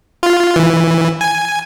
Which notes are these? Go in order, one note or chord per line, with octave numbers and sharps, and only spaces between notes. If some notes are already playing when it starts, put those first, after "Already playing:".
F4
E3
G#5